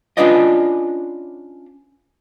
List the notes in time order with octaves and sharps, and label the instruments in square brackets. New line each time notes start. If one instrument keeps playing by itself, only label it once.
[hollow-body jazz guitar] C#4 D4 F4 B4 D5 D#5